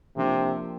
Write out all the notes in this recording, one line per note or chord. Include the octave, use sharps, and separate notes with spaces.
C3 F3 A#3 D4